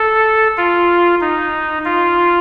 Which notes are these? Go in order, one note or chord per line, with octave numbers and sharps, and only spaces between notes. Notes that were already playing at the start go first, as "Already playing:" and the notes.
Already playing: A4
F4
D#4
F4